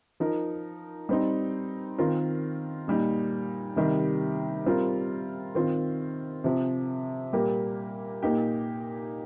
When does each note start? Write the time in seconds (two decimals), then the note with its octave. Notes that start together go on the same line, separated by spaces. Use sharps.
0.20 F3 D#4 A#4
1.09 G3 C4 D#4
1.98 D#3 C4 F4 A#4
2.88 A#2 G3 D#4
3.76 C3 D#3 G3 D#4 G4
4.66 G3 C4 F4 A#4
5.55 D#3 C4 F4
6.44 C3 F3 C4
7.33 A#2 G3 A#3 G4 A#4
8.23 A#2 A#3 D#4 G4